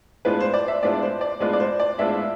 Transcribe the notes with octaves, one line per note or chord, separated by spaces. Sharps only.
A2 G#3 B3 D4 F4 B4
C5
D5
E5
A2 G#3 B3 D4 F4 D5
C5
D5
A2 G#3 B3 D4 F4 B4
D5
C5
D5
A2 G#3 B3 D4 F4 E5